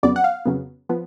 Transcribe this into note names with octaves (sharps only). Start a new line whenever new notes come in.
F2 C#3 F#3 B3 D5
F#5
F5
F2 C#3 F#3 B3
F3 B3